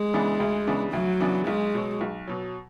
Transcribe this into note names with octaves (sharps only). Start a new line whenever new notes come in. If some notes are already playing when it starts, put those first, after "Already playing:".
Already playing: G#3
C#3 E3 B3 D4
D2
C#3 E3 B3 D4
D2 F#3
C#3 E3 B3 D4
B1 G#3
B2 F#3
B1
B2 F#3